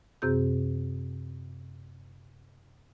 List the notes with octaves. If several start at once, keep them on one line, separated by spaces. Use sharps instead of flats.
F#2 C3 C4 G#4 G6